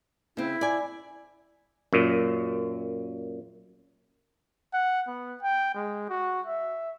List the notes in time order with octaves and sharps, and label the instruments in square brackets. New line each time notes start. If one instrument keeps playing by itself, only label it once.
[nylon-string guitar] C#3 C4 [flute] E4
[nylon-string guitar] D5 G#5
[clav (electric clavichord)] F#2 A#2
[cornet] F#5
B3
G5
G#3
F#4
E5